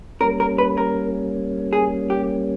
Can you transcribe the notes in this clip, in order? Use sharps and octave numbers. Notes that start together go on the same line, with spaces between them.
G3 A#3 C#4 A#4
A#4
B4
A#4
G#4
G4